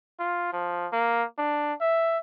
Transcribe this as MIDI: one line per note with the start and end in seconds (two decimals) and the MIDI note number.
0.19 0.52 65
0.53 0.87 53
0.92 1.24 58
1.38 1.73 62
1.81 2.18 76